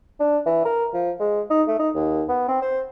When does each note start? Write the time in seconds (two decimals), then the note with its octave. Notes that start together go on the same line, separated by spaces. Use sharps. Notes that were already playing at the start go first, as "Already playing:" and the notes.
0.20 D4
0.46 E3
0.65 A#4
0.94 F3
1.20 G#3
1.50 D#4
1.67 A3
1.79 D#4
1.95 D#2
2.29 B3
2.48 C4
2.62 C5